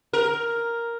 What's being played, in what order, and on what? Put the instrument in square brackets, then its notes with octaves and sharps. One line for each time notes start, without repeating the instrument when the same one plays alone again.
[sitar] A#4